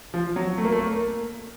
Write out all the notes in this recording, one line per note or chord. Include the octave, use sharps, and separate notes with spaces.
F3
F#3
A3
A#3
A3
A#3